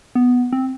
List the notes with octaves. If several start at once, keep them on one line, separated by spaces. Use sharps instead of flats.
B3
C4